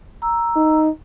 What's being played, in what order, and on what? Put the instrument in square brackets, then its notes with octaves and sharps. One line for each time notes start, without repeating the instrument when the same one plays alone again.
[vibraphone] A#5 E6
[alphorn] D#4